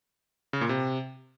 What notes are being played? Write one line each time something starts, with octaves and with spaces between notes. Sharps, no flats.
C#3
A#2
C3